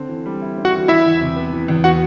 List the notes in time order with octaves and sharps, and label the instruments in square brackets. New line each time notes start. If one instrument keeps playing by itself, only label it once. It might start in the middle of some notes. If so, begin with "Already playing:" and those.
Already playing: [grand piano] D3 C4
E3
G3
E4
C4
[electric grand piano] F#4 F#5
[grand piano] E3
[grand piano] E3 [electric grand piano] E4 E5
[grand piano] E2
C3
B3
E3
E2
[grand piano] B3 [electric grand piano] F#4 F#5